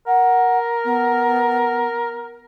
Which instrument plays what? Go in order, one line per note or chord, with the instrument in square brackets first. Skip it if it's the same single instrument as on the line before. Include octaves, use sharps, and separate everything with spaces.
[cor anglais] A#4 [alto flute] F#5
[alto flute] B3